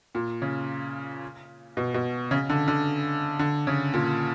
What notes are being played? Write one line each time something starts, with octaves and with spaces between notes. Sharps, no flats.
A#2
C#3
B2
B2
C#3
D3
D3
D3
C#3
A#2